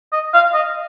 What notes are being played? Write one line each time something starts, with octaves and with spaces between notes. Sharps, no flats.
D#5
F5
D#5